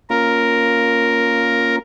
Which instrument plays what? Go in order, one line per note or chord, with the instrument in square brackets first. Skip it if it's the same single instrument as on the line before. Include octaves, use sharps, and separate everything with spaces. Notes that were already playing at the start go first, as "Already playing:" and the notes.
[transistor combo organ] A#3 C#4 F4 [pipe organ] A#4